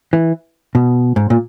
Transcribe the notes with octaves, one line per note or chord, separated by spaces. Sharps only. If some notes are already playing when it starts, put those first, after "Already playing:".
E3
B2
G#2
A#2